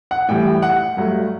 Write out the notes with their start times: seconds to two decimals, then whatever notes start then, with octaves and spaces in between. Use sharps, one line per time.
0.11 F#5
0.29 A2 E3 G3 G5
0.62 F#5
0.97 G2 F#3 A3